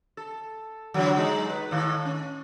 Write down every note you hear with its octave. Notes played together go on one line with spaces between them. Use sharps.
A4
D3 E3 F#3
G#3 D#4
B4
A2 D#3
C#4